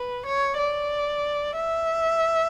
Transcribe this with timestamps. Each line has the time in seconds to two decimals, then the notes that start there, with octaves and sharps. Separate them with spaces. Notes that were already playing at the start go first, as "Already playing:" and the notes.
Already playing: B4
0.26 C#5
0.58 D5
1.56 E5